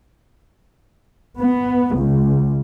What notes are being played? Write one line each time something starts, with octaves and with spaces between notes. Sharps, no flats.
B3
C#2